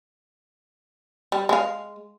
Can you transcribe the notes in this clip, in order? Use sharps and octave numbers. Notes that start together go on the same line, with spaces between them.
G3
G#3 F5